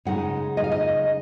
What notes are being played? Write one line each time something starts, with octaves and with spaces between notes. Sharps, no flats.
C#3 G#3 D#4 F#5
D#5
F5
D#5